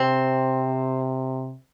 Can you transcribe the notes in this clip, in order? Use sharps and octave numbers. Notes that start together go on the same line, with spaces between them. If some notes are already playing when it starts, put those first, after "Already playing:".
Already playing: C3 C4